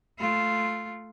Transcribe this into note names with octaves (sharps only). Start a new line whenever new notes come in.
A3 F4